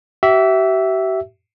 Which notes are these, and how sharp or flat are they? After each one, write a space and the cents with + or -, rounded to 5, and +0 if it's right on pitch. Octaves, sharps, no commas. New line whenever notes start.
G4 -45 E5 +0